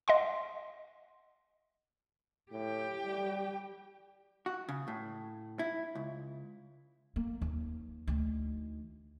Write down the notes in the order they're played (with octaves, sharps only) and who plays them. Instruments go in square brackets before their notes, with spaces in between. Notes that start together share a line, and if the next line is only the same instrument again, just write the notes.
[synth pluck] D#5 F#5 C6
[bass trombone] A2 [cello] G4 G5
[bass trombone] G3
[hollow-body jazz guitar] F#4
C#3
A2
E4
C#2
[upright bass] A#3
D#2
D2 D#3